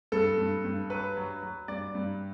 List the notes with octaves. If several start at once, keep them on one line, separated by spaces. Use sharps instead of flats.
G2 A4
G2
G2
F#3 B4
F#3
F#3
G2 D5
G2